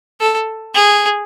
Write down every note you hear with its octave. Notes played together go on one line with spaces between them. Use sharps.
A4
G#4